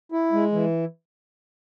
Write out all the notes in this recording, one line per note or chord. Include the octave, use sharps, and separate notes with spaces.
E4
G#3
E3